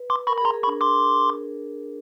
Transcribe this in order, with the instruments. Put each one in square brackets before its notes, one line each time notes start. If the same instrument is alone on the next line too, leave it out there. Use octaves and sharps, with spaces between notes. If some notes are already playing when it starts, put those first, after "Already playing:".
Already playing: [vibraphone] B4
[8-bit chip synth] C6 D6
[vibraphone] A#4 [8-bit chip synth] B5 C#6
[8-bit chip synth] B5
[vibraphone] G#4
[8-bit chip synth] A#5 C6
[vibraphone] G#4
[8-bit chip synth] B5 C#6
[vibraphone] D4
[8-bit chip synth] C6 D6